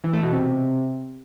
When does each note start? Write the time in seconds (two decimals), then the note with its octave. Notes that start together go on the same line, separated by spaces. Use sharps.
0.04 E3
0.13 A3
0.23 B2
0.32 C3